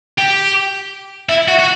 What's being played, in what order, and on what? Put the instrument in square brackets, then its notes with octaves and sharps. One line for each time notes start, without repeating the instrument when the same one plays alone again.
[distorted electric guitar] G4
E4
F#4
F#4